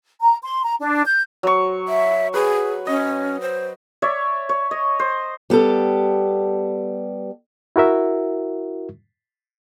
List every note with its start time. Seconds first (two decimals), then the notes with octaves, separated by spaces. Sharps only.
0.20 A#5
0.43 C6
0.64 A#5
0.80 D4
1.06 G6
1.43 F#3 C5 C#6
1.88 E5
2.34 G#4 B4
2.87 C#4 D#5
3.41 C5
4.02 C#5 D5 E5
4.49 C#5
4.71 D#5
5.00 C5
5.50 G3 B3 G4 A4
7.76 E4 F#4 A#4 E5